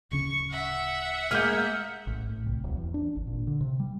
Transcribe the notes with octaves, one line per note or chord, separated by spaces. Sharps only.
D1 C#3 C#4 C#6
E5 F#5
G#3 A#3 G#4 F6 G6
A1
A2
C2
D1
E2
D4
G#1
A#2
D3
C3
G3